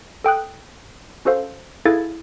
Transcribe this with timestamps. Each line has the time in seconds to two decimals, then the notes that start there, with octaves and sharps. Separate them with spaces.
0.24 A4 G5 D#6 F#6
1.25 C#4 F#4 A4 C5 F5
1.85 E4 G#4 A4 F5 G#6 A6